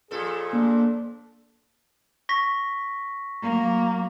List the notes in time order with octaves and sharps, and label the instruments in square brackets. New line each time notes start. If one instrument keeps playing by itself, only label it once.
[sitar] F2 A#2 A4 [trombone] G#4
[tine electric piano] A#3 [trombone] D4
[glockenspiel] C#6 A#6 B6
[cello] F#3 A#3